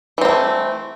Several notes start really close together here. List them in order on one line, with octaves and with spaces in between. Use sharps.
E3 C4 A#3 A3